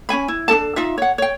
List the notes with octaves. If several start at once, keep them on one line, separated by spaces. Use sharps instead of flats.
C#4 D4 G#5 B5
E4
D4 D#4 A4 A5
D#4 F4 E5
C#5 F#5
C#5 G5